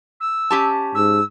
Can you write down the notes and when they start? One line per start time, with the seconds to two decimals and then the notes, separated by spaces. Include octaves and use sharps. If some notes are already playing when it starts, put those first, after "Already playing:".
0.20 E6
0.50 C#4 G4 A5
0.95 G#2 E6